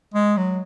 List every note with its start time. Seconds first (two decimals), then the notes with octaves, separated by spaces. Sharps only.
0.14 G#3
0.37 F#3